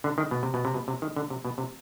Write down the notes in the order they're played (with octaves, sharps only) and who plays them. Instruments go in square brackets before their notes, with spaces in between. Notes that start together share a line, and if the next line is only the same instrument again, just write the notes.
[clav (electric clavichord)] D3
D#3
B2
C3
B2
C3
B2
C3
D#3
D3
C3
B2
C3